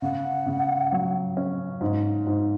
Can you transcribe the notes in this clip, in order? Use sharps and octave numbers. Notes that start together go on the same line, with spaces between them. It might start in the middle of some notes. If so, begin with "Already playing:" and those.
C#3 F#5
C#3
F#3
C#4
G#2
G#2